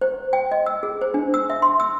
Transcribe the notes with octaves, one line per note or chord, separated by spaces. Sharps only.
C5
G5
D#5
E6
G#4
C5
D4
E6
E5
C6
E6